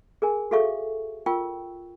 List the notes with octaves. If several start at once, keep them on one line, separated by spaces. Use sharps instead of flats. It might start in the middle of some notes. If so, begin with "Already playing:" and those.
G#4 A#4 G#5
F#4 G#4 A4 E5 F5 C#6
F4 A#4 G5 C#6 E6